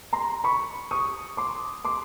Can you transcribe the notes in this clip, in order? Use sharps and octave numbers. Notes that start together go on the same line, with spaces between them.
A#5 C6
B5 C#6
C#6 D#6
C6 D6
C6 D6